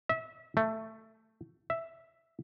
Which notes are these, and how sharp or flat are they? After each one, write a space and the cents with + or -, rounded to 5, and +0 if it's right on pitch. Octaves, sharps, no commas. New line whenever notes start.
E5 -30
A3 +10
E5 +0